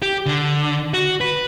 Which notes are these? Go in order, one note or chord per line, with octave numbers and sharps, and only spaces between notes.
G4
D3
F#4
B4